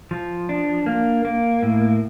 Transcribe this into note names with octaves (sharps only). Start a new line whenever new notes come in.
F3
D4
A#3
A#3
A2